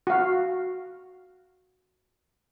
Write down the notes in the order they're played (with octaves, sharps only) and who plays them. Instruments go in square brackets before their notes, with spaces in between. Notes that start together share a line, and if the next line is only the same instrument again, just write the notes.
[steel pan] F#4 F5